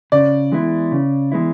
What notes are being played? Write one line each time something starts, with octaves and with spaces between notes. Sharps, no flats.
C#3 D5
E3 G#3 B3 E4
C#3
E3 G#3 B3 E4